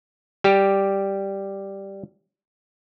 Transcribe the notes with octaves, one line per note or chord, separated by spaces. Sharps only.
G3 G4